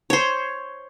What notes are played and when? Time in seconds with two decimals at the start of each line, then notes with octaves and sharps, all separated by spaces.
0.10 C5 C#5